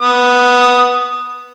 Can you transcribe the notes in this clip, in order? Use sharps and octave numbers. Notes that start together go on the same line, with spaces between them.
B3 D#6